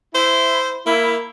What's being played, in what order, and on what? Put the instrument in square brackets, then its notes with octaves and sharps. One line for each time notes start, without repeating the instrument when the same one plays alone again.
[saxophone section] E4 [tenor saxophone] C5
[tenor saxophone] A#3 [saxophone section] E4